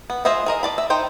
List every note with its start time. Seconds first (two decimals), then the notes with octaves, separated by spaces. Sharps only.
0.10 B3
0.25 F4 G#4 C5 D#5 E5
0.46 G#4 A#4 D#5
0.63 D5 A5 B5
0.78 E5
0.90 D#4 C5 G5